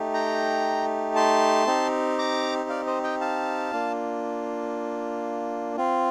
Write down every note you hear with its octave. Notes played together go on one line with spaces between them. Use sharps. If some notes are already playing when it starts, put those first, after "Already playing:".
Already playing: A3 D#4 G4
G5 A#5
A5 C6
C4 D#4 G4
A#5 D6
D5 F5
C5 D#5
D#5 G5
F5 A5
A#3 D4 F4
C4 F4